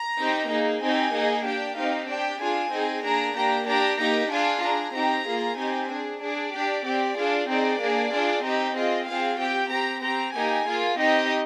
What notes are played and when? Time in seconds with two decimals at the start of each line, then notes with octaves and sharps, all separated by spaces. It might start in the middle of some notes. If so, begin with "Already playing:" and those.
Already playing: A#5
0.18 C4 D#4 G4
0.50 A#3 D#4 G#4
0.82 C4 D#4 G4 G#5
1.14 A#3 D#4 G#4
1.45 D4 G4 G5
1.76 C4 D#4 G4 F5
2.08 D4 G4 G5
2.41 D4 F4 G#4 G#5
2.72 C4 D#4 G#4
3.04 A#3 D4 G#4 A#5
3.36 A#3 D4 G4 A#5
3.67 D4 G4 A#5
3.99 A#3 D#4 G4 A#5
4.31 D4 F4 G#4 G#5
4.63 D4 G#4 A#5
4.94 C4 D#4 G4 A#5
5.26 A#3 F4 G#4
5.57 C4 D#4 G4 G#5
5.90 D4 G#4
6.21 D4 G#4 D5
6.53 D4 G4
6.85 C4 G4
7.16 D4 F4 G#4
7.48 C4 D#4 G#4 D5
7.80 A#3 D4 G#4
8.12 D4 F4 G#4
8.43 C4 D#4 G4 D#5
8.75 C4 F4 G#4 D#5
9.07 C4 F4 G#4 F5
9.39 C4 G4 G5
9.70 C4 G4 A#5
10.02 C4 G4 A#5
10.34 A#3 D#4 G4 G#5
10.65 A#3 F4 G#4
10.98 C4 D#4 G4 D#5